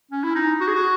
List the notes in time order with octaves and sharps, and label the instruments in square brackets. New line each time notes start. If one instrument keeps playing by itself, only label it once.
[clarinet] C#4
E4
D#4
F#4
G#4
F#4